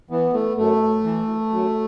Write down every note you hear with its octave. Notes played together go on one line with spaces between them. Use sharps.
E3 B3
A3
F#2 A3
E3
F#2